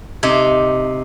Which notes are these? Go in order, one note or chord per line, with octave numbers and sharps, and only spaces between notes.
C3 D#4